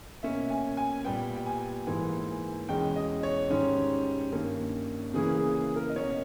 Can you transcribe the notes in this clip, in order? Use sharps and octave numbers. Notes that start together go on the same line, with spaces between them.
B2 A#3 C#4 E5
G#5
G#5
A#2 G3 B3 G5
G5
G#5
G#2 E3 A#3
E2 B2 G#3 C#4 G5
D#5
C#5
G#2 D#3 G3 C#4
G2 D#3 A#3 C#4
C#3 E3 A#3 C#4 G#4
G#4
G#4
A#4
D#5
B2 A#3 C#4 C#5